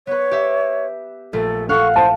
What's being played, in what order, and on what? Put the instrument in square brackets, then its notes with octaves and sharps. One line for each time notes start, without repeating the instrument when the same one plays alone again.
[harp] B3 B4 [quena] C#5
[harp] G4 E5
[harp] A#1 A3 [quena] A4
[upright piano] A4 [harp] F5 F#5 F#6 [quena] C#6
[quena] C5 [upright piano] A5